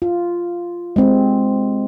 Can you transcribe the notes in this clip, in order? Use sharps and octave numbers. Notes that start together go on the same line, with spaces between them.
F4
G#3 C4